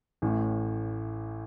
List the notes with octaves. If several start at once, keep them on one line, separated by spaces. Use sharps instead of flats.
A1 A2